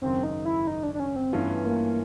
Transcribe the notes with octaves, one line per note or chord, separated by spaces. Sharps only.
G#1 F#2 C#3 C4
D#4
E4
D#4
D4
D4
C#4
C4
G2 E3 A3 B3 C#4 F4
A#3